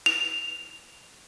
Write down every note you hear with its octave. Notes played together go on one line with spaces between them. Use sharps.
F7